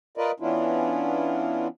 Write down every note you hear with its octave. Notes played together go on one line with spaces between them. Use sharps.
F4 A#4 B4 D5 D#5
E3 B3 C#4 D4 E4 F4